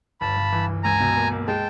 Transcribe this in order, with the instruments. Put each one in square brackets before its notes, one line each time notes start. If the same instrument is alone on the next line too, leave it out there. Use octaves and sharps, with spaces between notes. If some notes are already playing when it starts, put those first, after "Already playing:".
[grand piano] G1 [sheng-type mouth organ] A5 B5
[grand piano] G1
E3
G1
[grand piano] C#2 [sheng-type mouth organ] G#5 A#5
[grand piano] B2
A#3
A#3
[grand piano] G#3 [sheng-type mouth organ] G5 A5